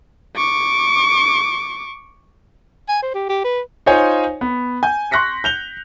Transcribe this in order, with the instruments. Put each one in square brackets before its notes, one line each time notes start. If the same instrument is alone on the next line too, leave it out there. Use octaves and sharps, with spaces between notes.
[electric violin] C#6 D6
[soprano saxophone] G#5
C5
G4
G4
B4
[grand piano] D#4 F4 C5 C#5 G#5
B3
G#5 G6
C6 C#6 F#6 A#6 B6 C#7
G6 F7 G7